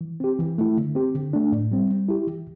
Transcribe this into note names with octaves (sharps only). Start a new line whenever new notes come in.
E3
C4 G4
E3
A3 E4
D3
C4 G4
D3
A3 D4
A2
G3 C4
G3
E4 G4
E3